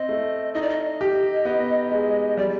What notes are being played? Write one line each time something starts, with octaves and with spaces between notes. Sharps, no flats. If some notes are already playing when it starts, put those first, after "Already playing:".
Already playing: C4 D#5
A3
D#4 D#5
D5
D#5
G4
B3
G#3
G3 D5